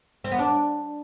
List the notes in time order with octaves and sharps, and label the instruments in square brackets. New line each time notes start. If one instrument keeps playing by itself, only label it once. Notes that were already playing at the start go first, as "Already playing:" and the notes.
[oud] C4
B3
D4